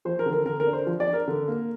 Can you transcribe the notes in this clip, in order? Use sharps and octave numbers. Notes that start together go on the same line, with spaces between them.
F3 C5
A#4
D3
A#4
D3 A#4
A#4
D4
C5
F3
D5
D4
A#4
D3
A#3